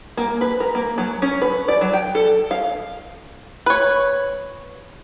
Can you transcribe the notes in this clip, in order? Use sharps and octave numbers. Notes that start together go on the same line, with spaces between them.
A#3
B4
A#4
A#3
F#3
C#4
B4
D5
F#3
G5
A4
F5
B4 C#5